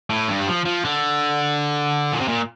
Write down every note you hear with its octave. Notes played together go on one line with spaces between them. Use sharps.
A2
G2
G3
F3
F3
D3
A#2
C3
A#2